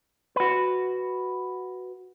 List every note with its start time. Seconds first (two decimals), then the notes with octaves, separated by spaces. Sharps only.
0.36 F#4 B4